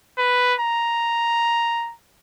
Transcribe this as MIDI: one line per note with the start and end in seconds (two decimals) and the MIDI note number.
0.18 0.55 71
0.61 1.94 82